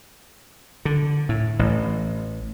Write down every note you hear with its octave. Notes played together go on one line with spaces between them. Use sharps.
D3
A2
A1